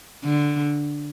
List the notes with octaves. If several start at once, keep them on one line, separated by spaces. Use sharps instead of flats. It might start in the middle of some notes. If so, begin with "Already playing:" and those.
D3